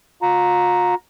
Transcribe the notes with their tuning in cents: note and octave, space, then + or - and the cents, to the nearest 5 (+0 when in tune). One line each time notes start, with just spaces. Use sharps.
F4 +40 A#5 +0